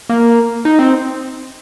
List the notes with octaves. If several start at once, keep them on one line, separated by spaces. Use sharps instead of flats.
A#3
D#4
C4